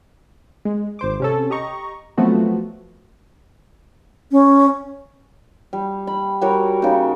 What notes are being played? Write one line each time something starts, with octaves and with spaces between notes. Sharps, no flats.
G#3
G#1 C5 D6
C3 C#4 A4
G4 D#5 A#5 C#6
F3 F#3 A3 B3 C4 F#4
C#4
G3
B5
G3 F#4 A#4 C#5
C#3 D#4